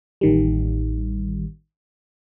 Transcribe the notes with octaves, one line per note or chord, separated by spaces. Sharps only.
A1 D#3 G3